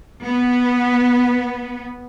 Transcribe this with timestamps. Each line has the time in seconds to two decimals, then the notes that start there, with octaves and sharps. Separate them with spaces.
0.24 B3